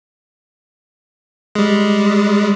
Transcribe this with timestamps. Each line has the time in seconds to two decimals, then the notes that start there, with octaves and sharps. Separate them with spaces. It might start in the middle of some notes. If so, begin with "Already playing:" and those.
1.55 G3 G#3